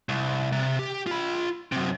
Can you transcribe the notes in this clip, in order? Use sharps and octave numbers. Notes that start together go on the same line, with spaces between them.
C2
C3
G4
F4 B5
F#2 C3